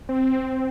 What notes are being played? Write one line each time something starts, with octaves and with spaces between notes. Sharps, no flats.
C4